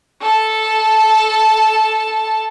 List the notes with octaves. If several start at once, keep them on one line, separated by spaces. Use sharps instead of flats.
A4 A5